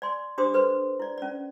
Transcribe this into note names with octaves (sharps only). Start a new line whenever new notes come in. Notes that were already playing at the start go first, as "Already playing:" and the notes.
D5 G#5 C6
D4 G4 C5 C6 D6 D#6
A4 B4 C5 C6
E4 D5
C#4 D5